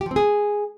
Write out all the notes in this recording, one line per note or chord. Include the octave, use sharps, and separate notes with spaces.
G4
F3
C4
G#4